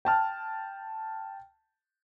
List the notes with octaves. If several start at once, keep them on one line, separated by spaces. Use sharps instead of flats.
G5 A5 F6